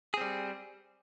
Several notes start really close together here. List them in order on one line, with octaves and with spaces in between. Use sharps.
G#4 C4 G3